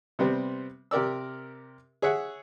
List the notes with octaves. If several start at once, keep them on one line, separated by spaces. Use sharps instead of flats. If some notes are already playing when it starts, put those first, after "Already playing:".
C3 G3 B3 C4
C3 G4 A#4 D5 E6
G#4 C#5 E5 F#5